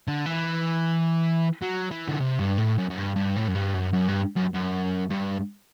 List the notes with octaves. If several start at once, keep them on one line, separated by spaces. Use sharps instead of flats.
D3
E3
F#3
E3
D3
C3
G2
A2
F#2
F#2
G2
G2
A2
F#2
G2
F#2
F#2
G2
F#2
F#2
G2